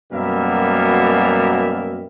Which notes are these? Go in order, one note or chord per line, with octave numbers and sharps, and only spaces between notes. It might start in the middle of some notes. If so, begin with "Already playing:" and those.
F#2 B2 G3 A#3 A#4 E5